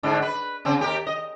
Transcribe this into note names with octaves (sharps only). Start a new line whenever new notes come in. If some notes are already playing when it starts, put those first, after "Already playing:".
G#2 D3
B4
C#3 C4
D#2 G4 A#4
D#5